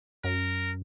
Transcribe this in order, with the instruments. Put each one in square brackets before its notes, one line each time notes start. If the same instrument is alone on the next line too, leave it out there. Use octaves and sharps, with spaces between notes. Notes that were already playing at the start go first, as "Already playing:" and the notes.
[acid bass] F#2 [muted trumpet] A#4